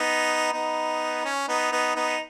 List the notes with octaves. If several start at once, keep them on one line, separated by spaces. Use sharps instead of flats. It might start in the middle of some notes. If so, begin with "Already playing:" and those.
Already playing: B3 D#4
B3 D#4
C#4
B3 D#4
B3 D#4
B3 D#4